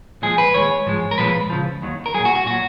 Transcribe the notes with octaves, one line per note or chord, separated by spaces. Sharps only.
A#2 F3 G#3 G#4
B4
D#2 D#3 G#3 C#5
G#2 F3 G#3
A#4
A#2 F3 G#3 B4
C#2 C#3 F3
D#2 D#3 F#3
A#4
A#2 F#3 G#4
F#4
F#4
A#2 F#3 F#4